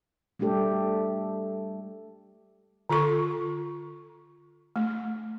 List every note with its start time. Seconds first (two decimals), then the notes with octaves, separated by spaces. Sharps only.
0.39 G3 A3 D4 G4 A4
2.89 D3 F4 A4 C#6
4.76 A3